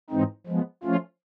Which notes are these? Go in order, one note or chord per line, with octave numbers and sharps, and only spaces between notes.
G#2 E3 G#3 C4 D#4
F3 G#3 B3
F3 A3 C#4 F4